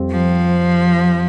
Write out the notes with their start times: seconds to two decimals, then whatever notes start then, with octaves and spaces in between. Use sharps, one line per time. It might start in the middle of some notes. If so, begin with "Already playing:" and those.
Already playing: F2 G3 C4
0.11 F3